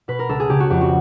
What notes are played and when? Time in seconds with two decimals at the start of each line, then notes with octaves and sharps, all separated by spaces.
0.08 B2 B4
0.19 A#4
0.29 C#2 A4
0.40 G#4
0.50 C#3 G4
0.60 F#4
0.70 F2 G4
0.81 F#4